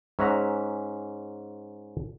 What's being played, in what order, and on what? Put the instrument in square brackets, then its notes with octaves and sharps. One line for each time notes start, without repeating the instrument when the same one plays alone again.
[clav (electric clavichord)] G#2 C#4 E5 F#5 A#5